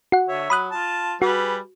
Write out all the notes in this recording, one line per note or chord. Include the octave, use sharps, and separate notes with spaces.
F#4 F#5
D3 C#5 E5
F#3 B5 D#6 F#6
F4 A5
G3 F#4 G#4 B4